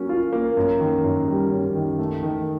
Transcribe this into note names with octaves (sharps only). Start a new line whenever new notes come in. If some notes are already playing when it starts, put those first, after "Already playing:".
Already playing: F#3 A#3 C#4
F4
A#3
F#2
D#3
F#2
G3
F#2
D#3
A3
D#3